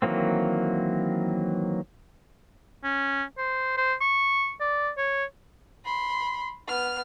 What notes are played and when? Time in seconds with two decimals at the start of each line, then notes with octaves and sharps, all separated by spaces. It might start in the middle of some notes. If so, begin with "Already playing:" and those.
0.02 D#3 E3 F#3 A#3 C4
2.84 C#4
3.38 C5
3.77 C5
4.01 C#6
4.60 D5
4.97 C#5
5.85 B5 C6
6.68 B3 F6